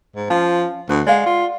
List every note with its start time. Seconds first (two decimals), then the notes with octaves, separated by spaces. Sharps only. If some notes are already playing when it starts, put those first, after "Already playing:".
0.16 G#2
0.30 F3 C#4 F5 A5
0.89 D2 B4
1.07 G#3 D5 F5 F#5
1.26 F4